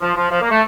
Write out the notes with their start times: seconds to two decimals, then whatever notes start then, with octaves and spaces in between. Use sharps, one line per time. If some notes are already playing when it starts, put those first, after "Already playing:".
0.02 F3
0.16 F3
0.30 F3
0.41 A#3
0.50 A3